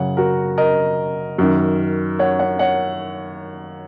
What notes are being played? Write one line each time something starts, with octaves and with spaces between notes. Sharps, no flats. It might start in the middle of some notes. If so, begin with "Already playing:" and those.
Already playing: F#2 C#3 C#5 F#5
F#4 A#4
A#4 D#5
F#2 D#3
C#5 F#5
C#5 F#5
C#5 F#5